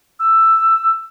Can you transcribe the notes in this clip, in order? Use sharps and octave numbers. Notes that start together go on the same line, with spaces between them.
E6